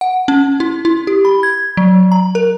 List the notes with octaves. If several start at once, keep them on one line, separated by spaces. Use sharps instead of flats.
F#5
C#4
E4
E4
G4
B5
G#6
F#3
A#5
A#4